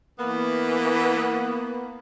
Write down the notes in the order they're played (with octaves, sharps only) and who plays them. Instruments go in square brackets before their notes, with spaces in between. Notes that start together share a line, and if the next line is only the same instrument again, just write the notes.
[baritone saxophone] E3 [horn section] A#3 B3